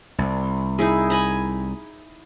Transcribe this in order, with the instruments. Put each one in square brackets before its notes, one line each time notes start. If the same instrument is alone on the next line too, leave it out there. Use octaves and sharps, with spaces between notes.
[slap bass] C2
[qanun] D#4 E4 G#4
G#5 A#5 B5